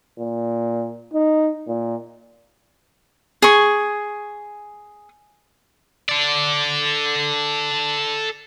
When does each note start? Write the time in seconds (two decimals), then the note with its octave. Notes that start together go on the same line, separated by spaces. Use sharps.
0.19 A#2
1.14 D#4
1.68 A#2
3.42 G#4 C#6
6.09 A4 D5